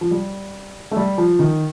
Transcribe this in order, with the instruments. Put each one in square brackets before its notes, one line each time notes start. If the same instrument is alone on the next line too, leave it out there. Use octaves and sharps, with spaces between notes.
[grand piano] F3
G3
A3
G3
F3
D#3